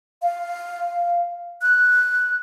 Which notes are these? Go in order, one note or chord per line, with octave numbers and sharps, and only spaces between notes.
F5
F#6